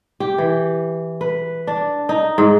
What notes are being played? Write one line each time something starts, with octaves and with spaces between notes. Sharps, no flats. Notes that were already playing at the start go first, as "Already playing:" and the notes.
G4
E3
B4
D4
D#4
G#2